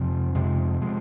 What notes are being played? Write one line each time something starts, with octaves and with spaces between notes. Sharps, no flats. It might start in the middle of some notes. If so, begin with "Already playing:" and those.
Already playing: F2 C3 F3 G#3
F2 C3 F3 G#3
C3 F3 G#3